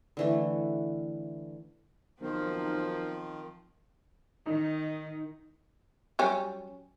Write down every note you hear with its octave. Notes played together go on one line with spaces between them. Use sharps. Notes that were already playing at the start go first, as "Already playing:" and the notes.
D3 E3 A3
B1 D#3 F3 C4 A#4 C5
D#3 D#4
F#3 G3 C#4